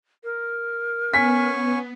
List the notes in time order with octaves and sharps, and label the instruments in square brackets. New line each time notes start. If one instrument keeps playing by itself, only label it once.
[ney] A#4
[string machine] B3 [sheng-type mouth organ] C#4 G#5 C#6 [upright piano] B6